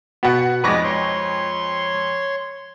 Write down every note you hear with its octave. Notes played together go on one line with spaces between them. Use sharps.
B2 B3 F#4 F#5
F2 G#3 D#4 B4 D5 C#6 D6 A#6
C#5 C6